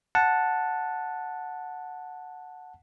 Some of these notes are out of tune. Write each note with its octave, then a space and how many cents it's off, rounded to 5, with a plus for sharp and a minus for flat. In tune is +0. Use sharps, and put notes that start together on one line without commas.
F#5 -10 A5 +0